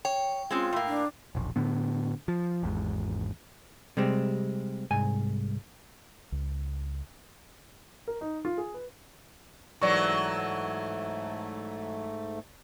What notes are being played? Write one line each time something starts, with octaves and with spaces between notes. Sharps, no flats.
C#5 G5
G#3 C4 C#4 F4
A2 A#3
D4
E1 A#1
A2 D3 B3
F3
G#1 E2 G#2
C3 G3 G#3 C4
C2 G#2 G#5
C#2
A#4
D#4
F4
G#4
B4
G#2 E3 F#3 A3 D5 C#6